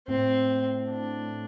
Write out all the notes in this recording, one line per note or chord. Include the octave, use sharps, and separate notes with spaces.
A2 C4
D4